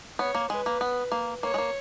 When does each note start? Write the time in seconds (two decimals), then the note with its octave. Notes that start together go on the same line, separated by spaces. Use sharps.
0.19 B3 C#5
0.35 A#3
0.50 G#3 B4
0.66 A#3
0.81 B3
1.12 A#3
1.43 A#3 C#5
1.54 G#3
1.58 A#3